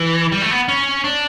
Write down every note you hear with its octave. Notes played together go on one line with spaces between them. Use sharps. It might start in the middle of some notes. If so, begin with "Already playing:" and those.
Already playing: E3
G3
A3
B3
C#4
D4